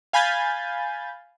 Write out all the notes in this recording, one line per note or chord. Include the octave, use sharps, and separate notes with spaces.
F5 G#5 B5 G6 A6